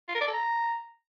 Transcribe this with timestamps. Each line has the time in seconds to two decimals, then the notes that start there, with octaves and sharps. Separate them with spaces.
0.08 F4
0.15 A#4
0.21 D5
0.27 A4
0.34 A#5